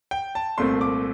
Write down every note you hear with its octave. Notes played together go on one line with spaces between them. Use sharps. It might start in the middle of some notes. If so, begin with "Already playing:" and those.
G5
A5
C2 A#2 A3 C4 C6
D6